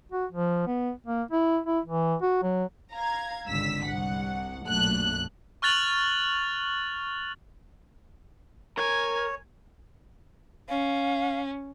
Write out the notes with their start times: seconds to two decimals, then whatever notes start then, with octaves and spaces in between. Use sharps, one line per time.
0.12 F#4
0.31 F3
0.67 B3
1.07 A#3
1.31 E4
1.67 E4
1.85 E3
2.22 F#4
2.43 F#3
2.93 F5 A#5 G#6
3.47 G#1 C#2 D3 E6 B6
3.86 C2 F#5
4.67 B1 F#2 A#2 A3 D4 F#6
5.62 C#6 F6 F#6 A6 F7 F#7
8.77 A#4 C#5 G#5
10.69 C#4 F5